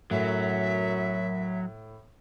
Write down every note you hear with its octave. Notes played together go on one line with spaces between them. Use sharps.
F#2 A2 F#3 E5